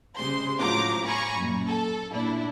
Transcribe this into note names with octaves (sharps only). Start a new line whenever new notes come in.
C#3 G3 G#3 C5 C6
A2 F3 F#3 F5 A#5 D6
F5 G#5 A#5 B5 C#6
F#2 A#2
A4
A#2 D4 E4